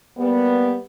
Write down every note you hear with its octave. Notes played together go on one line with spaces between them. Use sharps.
G3 A#3 B3